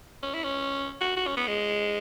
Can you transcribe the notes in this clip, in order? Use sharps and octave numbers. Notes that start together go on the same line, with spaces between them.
C#4
E4
C#4
F#4
F#4
C#4
B3
G#3